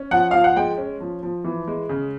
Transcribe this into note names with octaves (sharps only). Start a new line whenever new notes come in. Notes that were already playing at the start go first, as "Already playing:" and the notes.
Already playing: C#4
F3 F#5
F3 F5
F#5
G#3 G5
C#4
F3
F3
E3
G#3
C#3